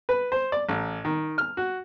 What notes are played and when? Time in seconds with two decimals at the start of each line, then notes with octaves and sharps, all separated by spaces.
0.09 B4
0.32 C5
0.52 D5
0.69 A1
1.05 D#3
1.38 F6
1.57 F#4